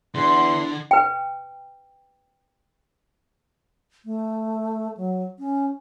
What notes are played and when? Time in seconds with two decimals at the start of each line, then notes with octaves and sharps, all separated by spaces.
0.15 E2 D3 C6
0.91 B4 G5
4.05 A3
4.97 F#3
5.39 C#4